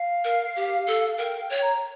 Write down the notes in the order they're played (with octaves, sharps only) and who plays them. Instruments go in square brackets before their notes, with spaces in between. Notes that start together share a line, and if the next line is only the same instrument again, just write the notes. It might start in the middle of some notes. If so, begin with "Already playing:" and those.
Already playing: [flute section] F5
[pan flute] A#4
G4
A4
[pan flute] A#4 [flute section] G5
[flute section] F5
G5
[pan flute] C#5
[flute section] A#5